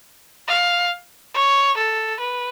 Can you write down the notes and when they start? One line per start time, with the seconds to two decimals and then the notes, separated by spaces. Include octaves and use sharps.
0.47 F5
1.34 C#5
1.77 A4
2.20 B4